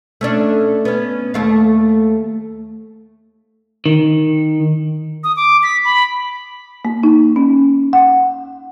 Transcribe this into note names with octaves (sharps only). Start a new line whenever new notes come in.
A3 C#4 D4
B3 C#4
D#2 A3 F5
D#3
D#6
D6
B6
B5
A#3
D#4
C#4
F#5